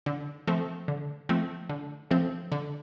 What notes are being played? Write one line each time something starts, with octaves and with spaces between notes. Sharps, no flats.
D3
F3 A3 C4
D3
F3 A3 C4
D3
F3 A3 C4
D3